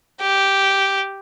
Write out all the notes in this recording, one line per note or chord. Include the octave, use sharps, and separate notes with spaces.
G4